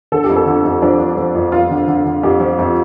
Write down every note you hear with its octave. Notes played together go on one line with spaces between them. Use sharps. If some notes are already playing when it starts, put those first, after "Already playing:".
D3 A4
G4
F2
A4
D3
F2
F3 D4
F3
F3
F2
F2 F4
D3
D3
D3
F2 G4
F3
F2